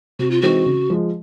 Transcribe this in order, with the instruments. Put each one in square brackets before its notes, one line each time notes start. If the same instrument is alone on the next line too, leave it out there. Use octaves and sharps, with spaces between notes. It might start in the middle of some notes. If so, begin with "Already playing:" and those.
[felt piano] C3 [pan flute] F#4
[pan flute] F4
[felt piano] E3 G#3 C4 D#4 [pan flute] F#4
[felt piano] C#3
F3 G#3